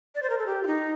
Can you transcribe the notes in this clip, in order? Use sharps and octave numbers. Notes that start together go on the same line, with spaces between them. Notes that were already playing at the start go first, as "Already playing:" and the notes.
D5
C5
A#4
A4
G4
F4
D#4